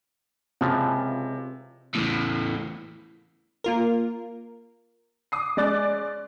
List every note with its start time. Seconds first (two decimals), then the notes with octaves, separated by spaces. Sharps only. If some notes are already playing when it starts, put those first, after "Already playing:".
0.61 C#2 C3 E3 F3
1.95 E2 A2
3.64 A#3 F4 A#4
5.32 D6 D#6 C7
5.57 G#3 C#4 D5 D6 F#6 A6